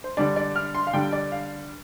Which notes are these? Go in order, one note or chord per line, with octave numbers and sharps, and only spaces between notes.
C5
D3 G3 D4 D5
D5
F6
C6
F5
D3 G3 D4 G5
D5
F5